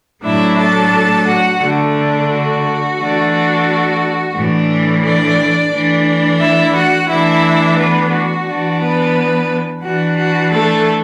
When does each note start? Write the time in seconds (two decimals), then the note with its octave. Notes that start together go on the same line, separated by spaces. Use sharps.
0.24 A2 F#3 A3 D4 E4 E5
0.59 A4 A5
1.27 F#4 F#5
1.61 D3 A3 D4
2.30 F#4
2.99 E3 A3 D4
3.33 F#4
4.35 A2 E3 A3 D4
5.04 D4 D5
5.73 E3 A3 D4
6.41 E4 E5
6.75 F#4 F#5
7.09 E3 A3 D4 E4 E5
7.78 B3 B4
8.12 F#4
8.47 E3 D4
8.80 B3 B4
9.84 E3 D4 F#4
10.18 F#4
10.52 A3 A4